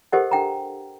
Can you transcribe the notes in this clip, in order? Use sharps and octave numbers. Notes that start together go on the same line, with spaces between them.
G4 A4 A#4 C5 D#5 F#5
D4 G5 A#5